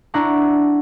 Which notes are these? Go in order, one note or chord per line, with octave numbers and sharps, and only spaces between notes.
D4 E4 F#5 A#5 C#6